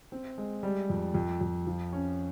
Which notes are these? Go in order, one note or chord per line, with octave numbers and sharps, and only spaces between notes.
C4
G#3
G3
F2
F2
F2
F3
C#4